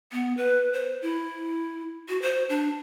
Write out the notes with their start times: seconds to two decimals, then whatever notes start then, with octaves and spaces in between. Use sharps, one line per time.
0.12 B3
0.37 B4
0.73 C5
1.02 E4
2.09 F#4
2.22 C5
2.49 D4